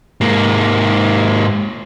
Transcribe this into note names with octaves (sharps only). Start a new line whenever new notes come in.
G#2 A#3